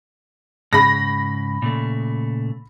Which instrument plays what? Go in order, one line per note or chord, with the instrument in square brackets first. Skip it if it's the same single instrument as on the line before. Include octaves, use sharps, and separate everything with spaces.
[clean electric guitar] G#2 C#3 [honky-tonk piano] B5 A#6
[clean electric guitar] A#2 C#3 A3